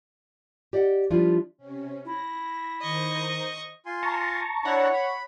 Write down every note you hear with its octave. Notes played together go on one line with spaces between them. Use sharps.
G4 D5 D#5 F5 F#5
F3 G3 D4 E4 F4
C3 C#4
E4 A#6
D#3 C5 D#5 A#5 C#6
F4 G#5 C6
A5 A#5 C#6
D4 E4 C#5 F#5
B5